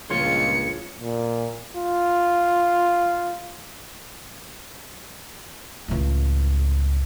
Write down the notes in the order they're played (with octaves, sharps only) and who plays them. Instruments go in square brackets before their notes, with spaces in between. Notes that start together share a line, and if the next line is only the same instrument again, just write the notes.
[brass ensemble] C#2 [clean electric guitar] G2 A#2 F3 [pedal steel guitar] F4 C#5 C6 [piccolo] C#7
[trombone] A#2
F4
[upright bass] C#2 A2